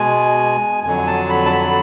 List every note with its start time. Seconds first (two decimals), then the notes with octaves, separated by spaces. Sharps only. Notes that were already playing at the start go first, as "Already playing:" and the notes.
Already playing: B2 G#3 G#5
0.84 F2 D3 F#3 G#5
1.07 A5
1.29 B5
1.46 A5
1.52 B5